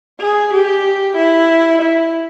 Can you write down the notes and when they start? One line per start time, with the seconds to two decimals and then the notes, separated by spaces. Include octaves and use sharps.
0.20 G#4
0.53 G4
1.17 E4
1.82 E4